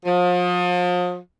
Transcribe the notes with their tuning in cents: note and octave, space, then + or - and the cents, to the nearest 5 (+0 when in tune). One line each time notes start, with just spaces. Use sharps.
F3 +35